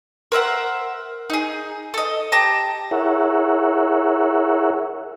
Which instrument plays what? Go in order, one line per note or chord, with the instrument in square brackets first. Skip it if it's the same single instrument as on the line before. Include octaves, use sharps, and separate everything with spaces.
[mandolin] A#4 C5 E5 F#5
D#4 G#4
A4 D#5
G4 A5 A#5
[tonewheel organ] E4 G#4 A#4 C#5 E5 F#5